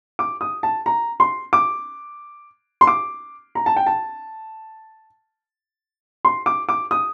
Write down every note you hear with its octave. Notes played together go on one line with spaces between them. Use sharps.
D6
D#6
A5
A#5
C6
D6
C6
D6
A#5
A5
G5
A5
C6
D6
D6
D#6